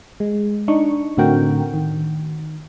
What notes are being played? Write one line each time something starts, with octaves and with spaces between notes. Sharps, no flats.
G#3
D4 D#4 C#6
A2 D3 C4 F#4 A#4 G5
D#3